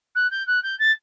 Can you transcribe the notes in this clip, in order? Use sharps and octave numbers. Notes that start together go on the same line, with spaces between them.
F#6
G6
F#6
G6
A6